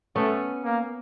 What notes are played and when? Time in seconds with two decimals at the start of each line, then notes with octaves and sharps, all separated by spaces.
0.15 A3 B3 C#4
0.64 A#3